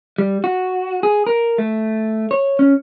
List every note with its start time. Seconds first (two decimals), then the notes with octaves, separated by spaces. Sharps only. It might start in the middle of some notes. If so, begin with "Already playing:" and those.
0.18 G3
0.44 F#4
1.03 G#4
1.27 A#4
1.58 A3
2.31 C#5
2.59 C#4